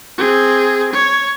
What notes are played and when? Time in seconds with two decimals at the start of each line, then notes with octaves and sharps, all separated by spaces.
0.18 C4 G#4
0.93 C#5